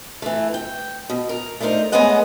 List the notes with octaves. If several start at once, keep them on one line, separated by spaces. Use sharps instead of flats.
E3 A3
G5
B2
A#4
A3 D4 D#4 A#4 C5
G#3 A3 B3 C#4 D#5 F#5